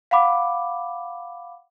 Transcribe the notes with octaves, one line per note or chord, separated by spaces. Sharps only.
F5 F#5 B5 D6